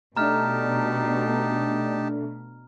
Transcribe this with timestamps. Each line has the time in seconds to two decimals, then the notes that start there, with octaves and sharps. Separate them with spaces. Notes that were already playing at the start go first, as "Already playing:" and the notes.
0.17 B2 A3 D4 D#4 G4 A5 A#5 F6